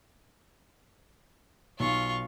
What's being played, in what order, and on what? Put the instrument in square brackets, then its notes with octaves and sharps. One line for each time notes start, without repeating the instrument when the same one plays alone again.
[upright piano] B1 [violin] F4 C#6